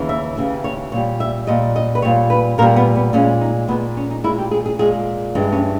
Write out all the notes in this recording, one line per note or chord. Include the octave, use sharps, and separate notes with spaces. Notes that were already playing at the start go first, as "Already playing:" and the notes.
Already playing: D#2 C#3 E3
E5
D#2 C#3 E3 E5
C#5
A#2 G3 C#5
E5
A#2 G3 D#5
D#5
B4
A#2 G3 C#5
B4
A#2 G3 A#4
B3
B3
A#2 G#3 C#4
D#4
A#2 G#3 B3
C#4
D#4
A#2 G#3 E4
G4
G#4
G#4
A#2 G#3 G#4
G2 E3 G#3
C#4